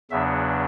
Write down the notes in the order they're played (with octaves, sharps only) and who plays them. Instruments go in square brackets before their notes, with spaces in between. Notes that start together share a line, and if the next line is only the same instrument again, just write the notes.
[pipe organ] E2 C#3 F#3 B3 D4 E5